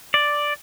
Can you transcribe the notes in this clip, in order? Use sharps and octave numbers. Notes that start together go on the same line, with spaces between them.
D5